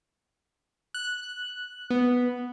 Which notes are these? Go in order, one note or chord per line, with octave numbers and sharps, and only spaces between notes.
F#6
B3